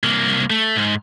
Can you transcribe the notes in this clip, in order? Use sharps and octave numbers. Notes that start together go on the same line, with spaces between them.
C2 A#3
A3
G#2